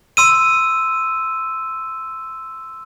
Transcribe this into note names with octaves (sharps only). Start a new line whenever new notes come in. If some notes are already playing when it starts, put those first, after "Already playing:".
C6 E6 D#7